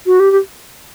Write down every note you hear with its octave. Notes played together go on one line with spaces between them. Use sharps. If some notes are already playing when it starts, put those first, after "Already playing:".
F#4
G4
G4